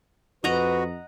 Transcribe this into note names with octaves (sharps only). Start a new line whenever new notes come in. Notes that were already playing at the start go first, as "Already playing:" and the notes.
F2 F#4 B4 D#5 F#5 A#5